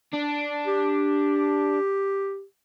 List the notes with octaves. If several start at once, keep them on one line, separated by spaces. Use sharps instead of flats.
D4
G4